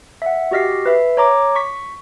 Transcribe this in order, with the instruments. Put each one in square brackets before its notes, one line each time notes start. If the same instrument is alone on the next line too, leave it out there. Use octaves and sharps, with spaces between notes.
[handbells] E5 F#5
F#4 G4 D#5 F6 B6 C7
B4 E5
C#5 A#5 D6
C#6 B6